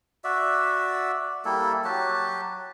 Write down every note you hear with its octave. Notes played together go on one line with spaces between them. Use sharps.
F#4 D5 E5
G3 A#3 E4 A4
F#3 F#4 G4 A5